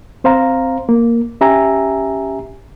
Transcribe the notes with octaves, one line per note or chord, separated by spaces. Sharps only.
C4 C5 F5 A#5
A#3
C#4 G4 E5 G#5 A#5